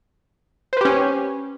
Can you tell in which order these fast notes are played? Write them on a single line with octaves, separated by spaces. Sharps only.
C5 B4 G4 C#4